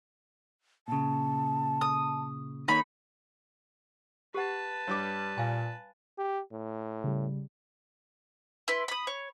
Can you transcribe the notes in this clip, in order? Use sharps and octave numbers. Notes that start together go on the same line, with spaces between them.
A#2 C#3 A5
D#6
D#2 A#3 D#4 C#5 B5
G4 B4 F#5 A5
G2 G3 C#5 D6
A#2 F5 G#5
G4
A2
C#3 G3
E4 B4 C6
B5 D#6
C#5